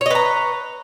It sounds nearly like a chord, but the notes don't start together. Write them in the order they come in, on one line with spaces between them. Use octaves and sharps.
C#5 D#5 B4 A#5